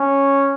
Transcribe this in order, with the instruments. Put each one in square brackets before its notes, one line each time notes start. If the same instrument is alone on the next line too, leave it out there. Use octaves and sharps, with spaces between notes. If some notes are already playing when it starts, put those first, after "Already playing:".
Already playing: [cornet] C#4